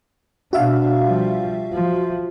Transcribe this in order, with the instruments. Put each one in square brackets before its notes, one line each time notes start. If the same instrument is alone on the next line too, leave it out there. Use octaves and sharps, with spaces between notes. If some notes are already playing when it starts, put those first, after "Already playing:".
[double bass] B2 D4 [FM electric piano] F#4 E5 F5
[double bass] F3 G3
F3